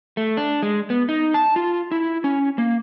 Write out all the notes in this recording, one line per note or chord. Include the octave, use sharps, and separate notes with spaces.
A3
D4
G#3
B3
D#4
A5
F4
E4
C#4
A#3